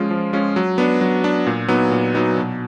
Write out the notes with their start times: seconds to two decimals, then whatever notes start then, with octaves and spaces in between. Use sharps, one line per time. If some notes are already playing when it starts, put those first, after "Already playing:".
Already playing: F3 G#3 C#4 F4
0.10 F3
0.33 G#3 C#4 F4
0.56 F#3
0.78 B3 D4
1.01 F#3
1.24 B3 D4
1.47 A#2
1.68 F#3 B3 D#4
1.91 A#2
2.14 F#3 B3 D#4
2.38 B2